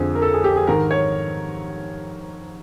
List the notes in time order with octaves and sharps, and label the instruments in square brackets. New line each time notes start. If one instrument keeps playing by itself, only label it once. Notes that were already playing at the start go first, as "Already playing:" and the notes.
Already playing: [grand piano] F2 D3 F3 G#4
A#4
A4
G#4
G4
G#4
G#2 D#3 A#4
C#5